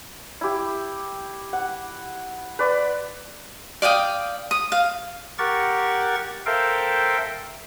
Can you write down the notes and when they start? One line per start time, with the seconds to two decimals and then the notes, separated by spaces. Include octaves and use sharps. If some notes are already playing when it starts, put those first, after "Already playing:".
0.41 E4 G4
1.53 F#5
2.59 B4 D5 C6
3.82 D5 F5 G5 D#6
4.51 D#6
4.72 F5
5.39 G4 A#4 F#5 C#6 A6
6.46 A4 A#4 C5 E5 F5 G5